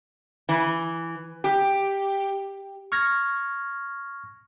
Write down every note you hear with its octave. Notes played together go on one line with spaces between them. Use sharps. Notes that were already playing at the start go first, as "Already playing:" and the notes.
E3
G4
C#6 F6 G#6 A#6